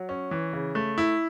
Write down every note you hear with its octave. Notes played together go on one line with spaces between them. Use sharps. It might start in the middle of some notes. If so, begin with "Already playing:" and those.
Already playing: F#3
C#4
E3
C#3
A3
E4